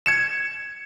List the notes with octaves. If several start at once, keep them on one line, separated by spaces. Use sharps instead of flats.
G#6 C#7 E7